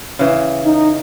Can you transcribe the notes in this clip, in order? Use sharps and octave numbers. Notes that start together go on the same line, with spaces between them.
C#3 E3
D#4